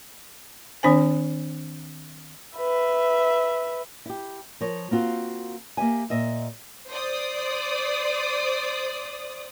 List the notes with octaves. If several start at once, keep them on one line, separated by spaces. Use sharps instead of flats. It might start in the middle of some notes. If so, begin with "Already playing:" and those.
D#3 C4 D4 C5 G#5
B4 E5
E4 G4
F3 A#4 C#5
A#3 C4 F4 F#4 C5
A#3 G4 E5 G#5
A#2 D#5 E5
C5 D5 D#6